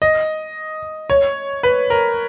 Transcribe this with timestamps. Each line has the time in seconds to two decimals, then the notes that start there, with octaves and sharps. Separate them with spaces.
0.02 D#5
1.10 C#5
1.63 B4
1.90 A#4